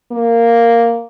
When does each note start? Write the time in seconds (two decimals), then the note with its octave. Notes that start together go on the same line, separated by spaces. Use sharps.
0.12 A#3